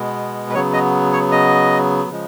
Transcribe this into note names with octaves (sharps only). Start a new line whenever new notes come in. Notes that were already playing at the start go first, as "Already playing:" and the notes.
Already playing: B2 G#3 B3
B4
C#3 F#3 B3 C#5
D#5
C#5
D#5
C#3 F3 G#3